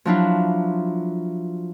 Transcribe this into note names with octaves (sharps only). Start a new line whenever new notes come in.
F3 F#3 D4 E4 F4